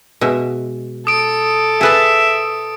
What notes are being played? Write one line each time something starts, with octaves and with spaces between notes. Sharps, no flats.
B2 G#3 E5
A4 D#6 D7
G#4 B4 E5 A5